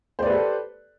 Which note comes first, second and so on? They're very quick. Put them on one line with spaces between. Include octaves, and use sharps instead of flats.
C5 D5 B4 G4 A4